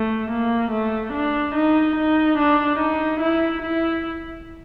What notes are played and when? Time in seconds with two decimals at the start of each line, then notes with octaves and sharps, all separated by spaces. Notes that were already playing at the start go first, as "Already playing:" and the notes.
Already playing: A3
0.30 A#3
0.71 A3
1.13 D4
1.55 D#4
1.96 D#4
2.38 D4
2.79 D#4
3.20 E4
3.62 E4